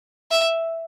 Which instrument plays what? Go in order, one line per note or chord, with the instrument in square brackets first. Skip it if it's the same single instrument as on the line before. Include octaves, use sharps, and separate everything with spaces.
[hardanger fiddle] E5